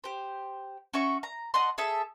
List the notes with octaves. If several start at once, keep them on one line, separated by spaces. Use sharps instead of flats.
G4 C5
C#4 F#4 E5 C#6
A#5
D#5 F#5 A5 C6
G#4 A4 E5 A5